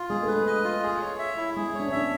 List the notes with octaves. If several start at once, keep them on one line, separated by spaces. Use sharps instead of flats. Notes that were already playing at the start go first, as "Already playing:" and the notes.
Already playing: F4
G#3 G#4
A3 B4
G#3
D#5
F4
G#4
C#5
E5
E4
G#3 G#4
C#5
D4
C#4
D4 E5